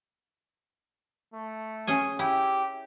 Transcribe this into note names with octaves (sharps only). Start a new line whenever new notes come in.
A3
C#4 G#4 G#5
E4 G4